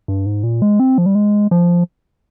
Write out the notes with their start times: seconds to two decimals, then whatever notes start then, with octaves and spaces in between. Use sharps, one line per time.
0.08 G2
0.26 G#2
0.43 A#2
0.62 G#3
0.80 C4
0.98 F3
1.06 G3
1.15 G#3
1.51 F3